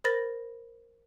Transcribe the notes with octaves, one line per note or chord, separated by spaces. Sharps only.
A#4 C5 B5 A6 A#6